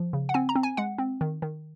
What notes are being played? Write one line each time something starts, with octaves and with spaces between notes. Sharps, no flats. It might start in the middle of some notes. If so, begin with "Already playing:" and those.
Already playing: F3
C#3
F#5
C4 G#5
A#5
C4
G#5
G#3 F#5
C4
D#3
D#3